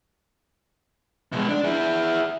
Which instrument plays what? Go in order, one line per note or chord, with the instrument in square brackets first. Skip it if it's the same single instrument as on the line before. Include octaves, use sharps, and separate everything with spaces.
[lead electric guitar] B2 G#3
D4
E4 G#4